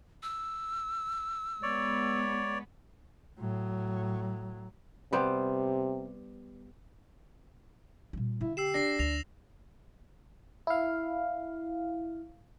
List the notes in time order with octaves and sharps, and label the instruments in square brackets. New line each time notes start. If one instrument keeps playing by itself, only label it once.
[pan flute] E6
[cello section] G#3 B3 [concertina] C#5 D5
[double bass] A2 F#3
[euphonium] C3 [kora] G3 B3 C5
[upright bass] A#2 G3
[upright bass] D3 [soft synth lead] E4
[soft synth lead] G4 [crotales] E6 C7 E7
[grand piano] D4 [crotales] A#6 C7
[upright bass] D2 [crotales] A#6 F7
[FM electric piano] E4 F5